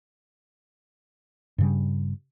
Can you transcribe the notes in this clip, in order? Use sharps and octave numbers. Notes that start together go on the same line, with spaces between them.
G2 C#3 G3